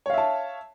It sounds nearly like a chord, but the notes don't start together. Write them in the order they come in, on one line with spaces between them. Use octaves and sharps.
C#5 F5 E5 A5